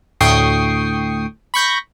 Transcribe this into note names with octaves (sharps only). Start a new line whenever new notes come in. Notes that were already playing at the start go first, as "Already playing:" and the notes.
D2 A2 G5 C#6 D#6 C7
B5 C#6 G6 A#6